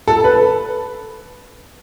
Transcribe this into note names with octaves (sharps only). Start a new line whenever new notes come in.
A4
B4